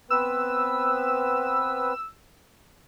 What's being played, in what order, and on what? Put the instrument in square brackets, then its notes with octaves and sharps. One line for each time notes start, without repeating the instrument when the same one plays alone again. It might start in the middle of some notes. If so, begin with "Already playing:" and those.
[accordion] B3 C4 B4 [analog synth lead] E6